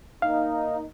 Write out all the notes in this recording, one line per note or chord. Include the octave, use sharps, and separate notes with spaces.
A#3 D#4 F5